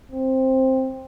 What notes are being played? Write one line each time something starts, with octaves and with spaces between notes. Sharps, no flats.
C4